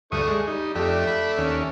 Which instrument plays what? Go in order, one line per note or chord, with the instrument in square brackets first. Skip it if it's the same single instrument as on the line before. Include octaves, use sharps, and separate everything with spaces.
[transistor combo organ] D2 G2 D#6 [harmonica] A3 D4 C#6
[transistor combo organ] G#3
[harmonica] G3 [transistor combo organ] D#4
[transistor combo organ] F2 G4 [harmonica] A3 D4 E5
[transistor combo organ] B5
D#2 C#4